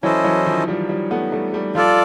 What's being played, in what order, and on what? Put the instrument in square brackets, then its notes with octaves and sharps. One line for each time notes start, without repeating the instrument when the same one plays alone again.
[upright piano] E3 F#3 [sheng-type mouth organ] C#4 E4 A4 C5 D#5
[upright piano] E3 F#3
D#3 F3
F3 G3
F3 G3
A3 B3
G3 A3
G3 A3
[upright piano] F3 G3 [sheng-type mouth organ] F4 A4 D5